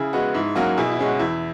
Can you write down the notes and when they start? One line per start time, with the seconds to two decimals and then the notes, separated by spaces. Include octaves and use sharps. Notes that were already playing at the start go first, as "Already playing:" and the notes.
Already playing: C#3 E4 G#4
0.13 G#3 B3 F#4
0.34 G#2 E4
0.56 F#3 A#3 C#4 F#4
0.77 B2 E4 G#4
0.92 E4
0.99 G#3 C#4
1.06 F#4
1.19 E2 E4